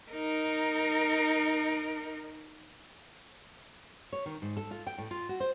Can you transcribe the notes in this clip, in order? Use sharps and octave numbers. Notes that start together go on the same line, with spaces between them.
D#4 A#4
C#5
D#3
G#2
A4
F4
G5
A2
F4
F#4
C5